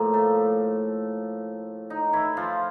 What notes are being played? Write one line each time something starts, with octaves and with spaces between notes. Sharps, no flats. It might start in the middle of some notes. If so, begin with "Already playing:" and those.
Already playing: A2 F3 A#3
A3 A4
D#4
E3 E4
F3 F4